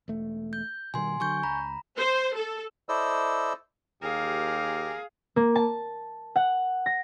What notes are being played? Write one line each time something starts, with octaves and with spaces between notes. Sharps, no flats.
E1 A3
G6
B2 D#3 G3 G#5 C6
D3 F#3 G#5 C#6 G6
C#2 A#5 B5
C5
A4
E4 A4 C5 D5 D#5 E6
D#2 G4 G#4 A#4 F5
A#3
A5
F#5
A#6